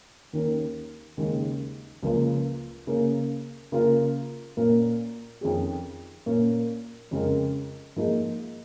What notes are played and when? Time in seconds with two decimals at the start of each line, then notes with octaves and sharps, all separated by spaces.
0.33 D#2 D#3 C#4 A#4
1.17 D#2 C#3 G#3
2.03 C#2 C#3 F3 A#3 F4
2.87 C#3 A#3 C#4
3.72 C#3 A#3 F4 A#4
4.57 A#2 A#3 C#4 A#4
5.41 F2 D#3 C#4 G#4
6.26 A#2 A#3 C#4
7.11 F2 C#3 G#3 C#4 A#4
7.96 G#2 F3 A#3 D#4 G#4